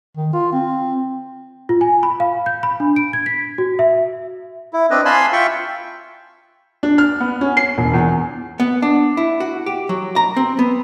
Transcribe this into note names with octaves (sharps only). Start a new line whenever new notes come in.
D#3
F4
C4
F4
G#5
B5
F5
G6
B5
D4
D7
G#6
B6
F#4
E5
E4
C4 D4 B4 D#5
F5 G#5 A5 B5 C6
F4 E5 G5 C#6
D4
F6
B3
C#4
C7
E1
E2
B3
D4
E4
F#4
G4
F#3
A#5
C4
B3